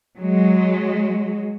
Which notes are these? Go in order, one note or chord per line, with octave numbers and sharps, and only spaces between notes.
F#3 G#3